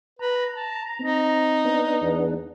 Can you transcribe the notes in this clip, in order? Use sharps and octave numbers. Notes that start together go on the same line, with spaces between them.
B4 A#5
A5
C4 D#4
B3 D4
E2